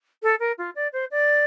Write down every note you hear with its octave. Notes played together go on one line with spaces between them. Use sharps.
A4
A#4
F4
D5
C5
D5